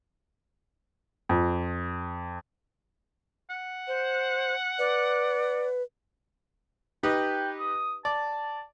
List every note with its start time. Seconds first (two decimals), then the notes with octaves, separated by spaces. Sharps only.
1.29 F2
3.50 F#5
3.88 C5
4.79 B4 D5
7.03 D#4 G4 B4 G5
7.59 D#6
8.05 D5 A5